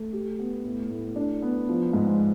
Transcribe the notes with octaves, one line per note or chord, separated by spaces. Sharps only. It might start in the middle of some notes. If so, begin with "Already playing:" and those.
Already playing: A3
G4
B3
A2
A2
D4
B3
F3
G#2